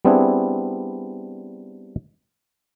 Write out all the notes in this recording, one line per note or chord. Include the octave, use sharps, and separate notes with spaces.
G3 B3 C4 D4 E4 G#4